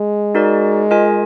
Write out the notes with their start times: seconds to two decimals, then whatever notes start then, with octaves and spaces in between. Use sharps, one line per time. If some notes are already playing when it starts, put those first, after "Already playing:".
Already playing: G#3
0.35 D#4 F#4 A#4 D5
0.91 F4 A#4 D#5 G#5